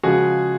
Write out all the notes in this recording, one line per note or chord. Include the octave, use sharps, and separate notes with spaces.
C#3 F3 G#3 F#4 G#4